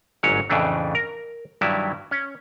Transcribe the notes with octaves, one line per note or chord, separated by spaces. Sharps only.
G1 G#2 F#3 C#4 C#5
F2 A2 C#3 E3 A3 D4
A#4
G2 D#3 F#3 G3 E4
C#4